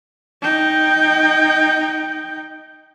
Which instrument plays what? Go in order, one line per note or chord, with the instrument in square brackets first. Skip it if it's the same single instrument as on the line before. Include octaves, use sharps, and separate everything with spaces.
[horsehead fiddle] D#4 G5